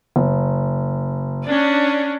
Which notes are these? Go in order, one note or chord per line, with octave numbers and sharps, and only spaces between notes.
F#1
C#4 D4